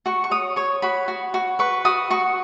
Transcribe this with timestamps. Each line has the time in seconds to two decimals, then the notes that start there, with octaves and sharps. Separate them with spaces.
0.06 F#4 C#6
0.24 C#6
0.31 C#5 D#6
0.56 C#5 C#6
0.82 F#4 B5
1.08 F#4
1.34 F#4
1.59 B4 C#6
1.85 F#4 D#6
2.11 F#4 C#6